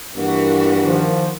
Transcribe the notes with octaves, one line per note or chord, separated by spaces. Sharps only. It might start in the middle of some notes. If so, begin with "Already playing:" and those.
G2 E3 A#3 F#4
D#3 F3